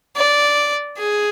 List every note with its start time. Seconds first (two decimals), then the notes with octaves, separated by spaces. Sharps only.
0.16 D5
0.97 G#4